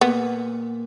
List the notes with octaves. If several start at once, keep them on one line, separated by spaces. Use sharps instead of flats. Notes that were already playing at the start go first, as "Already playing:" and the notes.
A#2 B3